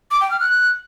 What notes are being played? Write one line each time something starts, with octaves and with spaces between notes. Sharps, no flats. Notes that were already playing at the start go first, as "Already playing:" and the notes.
D6
G5
F6
F#6